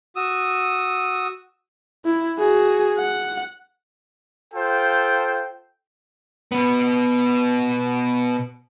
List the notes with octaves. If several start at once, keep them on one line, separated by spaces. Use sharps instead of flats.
F#4 D#6 E6
E4
F#4 G#4
F#5
F4 A4 C5 G5
B2 B3